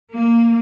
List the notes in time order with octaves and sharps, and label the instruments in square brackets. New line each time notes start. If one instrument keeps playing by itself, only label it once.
[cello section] A#3